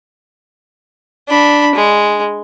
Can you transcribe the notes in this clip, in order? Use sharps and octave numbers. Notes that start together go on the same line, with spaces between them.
D4 B5
G#3